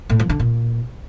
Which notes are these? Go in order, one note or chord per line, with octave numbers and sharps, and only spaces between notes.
A2
F3
D3
A#2